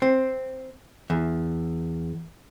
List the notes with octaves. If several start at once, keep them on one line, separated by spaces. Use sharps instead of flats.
C4
E2